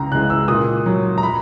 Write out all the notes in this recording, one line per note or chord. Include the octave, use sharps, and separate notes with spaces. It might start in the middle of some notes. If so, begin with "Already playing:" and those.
Already playing: C#2 A#5
C#3 E3 G#3 F#6
E6
A#2 D#6
F#3
A#5
B5